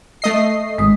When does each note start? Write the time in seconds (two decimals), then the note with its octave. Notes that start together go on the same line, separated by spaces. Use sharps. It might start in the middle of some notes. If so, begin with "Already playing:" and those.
0.22 A3 D#5 C7
0.78 G#1 G#3 D#6